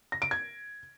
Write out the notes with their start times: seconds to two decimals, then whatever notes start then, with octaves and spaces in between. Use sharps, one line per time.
0.12 A#6
0.22 D7
0.31 G#6